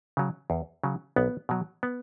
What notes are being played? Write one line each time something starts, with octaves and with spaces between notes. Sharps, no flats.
C#3 F#3
E2
C#3 F#3
B1 B3
B2 F#3
B3